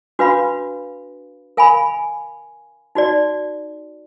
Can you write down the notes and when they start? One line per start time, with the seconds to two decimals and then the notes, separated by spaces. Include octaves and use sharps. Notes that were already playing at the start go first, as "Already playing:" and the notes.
0.19 D4 F#4 B4 F5 B5
1.57 A#4 F5 G#5 B5
2.95 D#4 F#4 D5